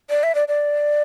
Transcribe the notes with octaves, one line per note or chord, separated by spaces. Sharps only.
D5
E5
D5
D5